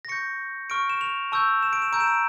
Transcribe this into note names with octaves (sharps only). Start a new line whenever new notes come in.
A#6
C#6 G6 C#7
C#6 F6 D7
E7
F7
A5 C#6 E6 G6
E7
D7
E7
A#5 E6 G6 D7
E7
D7